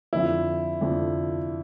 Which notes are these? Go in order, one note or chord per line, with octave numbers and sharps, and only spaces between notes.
F2 D3 F3 E4
F2 D3 F3